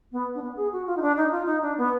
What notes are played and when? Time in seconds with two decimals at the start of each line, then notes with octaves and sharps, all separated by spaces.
0.12 B3
0.35 D4
0.42 B3
0.57 G#4
0.72 F#4
0.87 F4
0.97 D#4
1.02 D4
1.17 D#4
1.31 F4
1.45 D#4
1.62 D4
1.78 B3